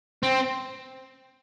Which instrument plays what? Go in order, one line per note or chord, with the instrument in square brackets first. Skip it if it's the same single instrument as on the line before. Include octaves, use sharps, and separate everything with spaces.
[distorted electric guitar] C4